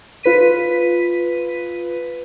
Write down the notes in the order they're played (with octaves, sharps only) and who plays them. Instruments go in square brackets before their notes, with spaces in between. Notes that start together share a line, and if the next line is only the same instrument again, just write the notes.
[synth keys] F4 B4 B6 D#7